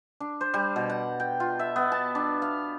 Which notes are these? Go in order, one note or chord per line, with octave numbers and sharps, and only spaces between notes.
D4
C5
G3
B2
F#5
G5
F4
E5
B3
A5
D4
F5